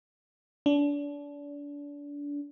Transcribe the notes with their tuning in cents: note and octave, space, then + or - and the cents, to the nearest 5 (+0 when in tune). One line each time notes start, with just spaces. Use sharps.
D4 -30